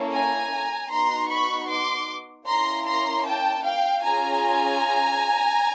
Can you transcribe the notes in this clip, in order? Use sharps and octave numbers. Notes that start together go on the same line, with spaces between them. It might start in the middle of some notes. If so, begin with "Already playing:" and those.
Already playing: A#3 C#4 E4 A4
G#5 A#5
B3 D#4 F#4 A#5 C6
B5 C#6
C6 D6
A#3 C#4 E4 A#5 C6
A#5 C6
G5 A5
F5 G5
C#4 F4 G#4 G#5 A#5